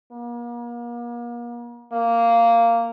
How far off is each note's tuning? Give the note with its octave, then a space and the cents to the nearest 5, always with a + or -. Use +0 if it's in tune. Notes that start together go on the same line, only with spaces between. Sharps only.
A#3 +40
A#3 -10